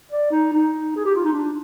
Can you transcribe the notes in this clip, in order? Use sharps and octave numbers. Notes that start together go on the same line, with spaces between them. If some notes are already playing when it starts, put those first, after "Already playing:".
D5
D#4
D#4
G#4
G4
F4
D#4
D4